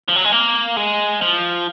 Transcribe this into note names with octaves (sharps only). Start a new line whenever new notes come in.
F3
F#3
G#3
A#3
G#3
F3